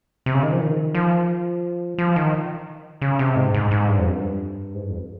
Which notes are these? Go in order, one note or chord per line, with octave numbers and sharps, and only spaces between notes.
C3
C#3
D#3
F3
D#3
F3
F3
D#3
C#3
C3
G#2
G#2
G#2
G2
F2
G2
G#2
G2
F2